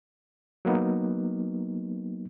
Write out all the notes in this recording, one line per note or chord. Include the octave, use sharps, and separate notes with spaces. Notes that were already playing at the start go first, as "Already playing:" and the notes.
F#3 A#3 B3 D#4